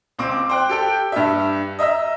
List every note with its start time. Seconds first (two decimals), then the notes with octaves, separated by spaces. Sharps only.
0.19 C#2 C4 D6
0.49 C5 G5 F#6
0.69 G4 A4 G5
1.12 G2 G4 E5
1.79 D#5 E5 A#5 E6